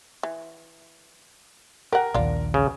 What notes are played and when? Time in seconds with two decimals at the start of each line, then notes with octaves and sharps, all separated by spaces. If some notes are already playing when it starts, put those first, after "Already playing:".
0.23 E3
1.92 G4 A#4 F#5
2.14 A#1 D#2 D4 F4
2.54 C#3